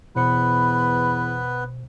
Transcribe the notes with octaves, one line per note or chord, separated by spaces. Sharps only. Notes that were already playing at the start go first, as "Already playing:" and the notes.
E2 B2 B3 B4 C5 B5 C#7